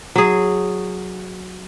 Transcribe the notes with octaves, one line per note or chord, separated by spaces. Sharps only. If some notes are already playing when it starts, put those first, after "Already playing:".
F#3 G#4